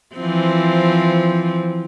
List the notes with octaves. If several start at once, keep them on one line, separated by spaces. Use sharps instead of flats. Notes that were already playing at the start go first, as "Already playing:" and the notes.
E3 F3 C4